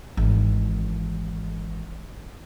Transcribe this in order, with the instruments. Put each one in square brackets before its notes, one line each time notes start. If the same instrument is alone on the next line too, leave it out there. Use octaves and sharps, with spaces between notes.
[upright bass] G#1 E3